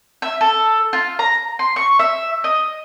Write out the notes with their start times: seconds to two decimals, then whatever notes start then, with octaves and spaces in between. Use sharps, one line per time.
0.22 E5
0.41 A4
0.93 F4
1.19 A#5
1.59 C6
1.76 C#6
1.99 E5
2.44 D#5